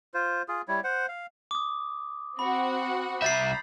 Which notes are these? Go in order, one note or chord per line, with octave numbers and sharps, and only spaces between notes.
F4 C5
F4 G#4
G3 E4 C#5
C5 F#5
F5
D6 D#6
C4 F#4 F#5 B5
C2 E5 A#5 B5 G6 A6 C7